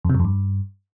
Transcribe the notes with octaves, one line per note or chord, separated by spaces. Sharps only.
F2
C3
F#2
F2
G2